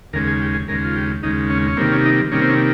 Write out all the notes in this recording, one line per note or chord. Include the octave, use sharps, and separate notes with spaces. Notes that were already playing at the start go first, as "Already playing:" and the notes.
D#2 C#3 G#3 A#4
G#4
G4
G#4
D#2 C#3 G#3 A#4
F4
G4
D#2 C#3 G#3 D#4
C#4
C#4
C3 D#3 G3 A#3 C4
C#4
D#4
C3 D#3 G3 A#3 C#4
C4
C#4